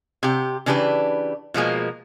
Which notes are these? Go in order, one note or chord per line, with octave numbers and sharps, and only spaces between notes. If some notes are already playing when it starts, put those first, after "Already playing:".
C3 G4
C#3 E3 D4 G4 B4
B2 F3 G#3 A#3